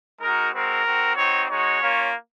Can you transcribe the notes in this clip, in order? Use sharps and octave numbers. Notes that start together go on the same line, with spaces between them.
G#3 D#4 F#4 A#4
G#3 C4 F#4 A#4
C4 F#4
C4 D#4 F#4 C#5
G#3 D#4 F#4 C#5
A#3 C#4 F4